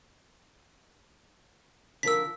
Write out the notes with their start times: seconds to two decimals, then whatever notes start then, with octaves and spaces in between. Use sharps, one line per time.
2.03 D3 F3 A#4 E6 B6